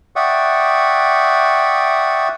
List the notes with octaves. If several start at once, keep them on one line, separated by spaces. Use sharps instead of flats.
D5 E5 F#5 G5 C#6 D#6